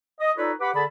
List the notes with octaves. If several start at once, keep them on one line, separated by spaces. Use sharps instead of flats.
D#5
D#4 F4 A4 B4 C#5 D5
G4 B4 F#5 B5 D6
D3 G#4 D5 A5 B5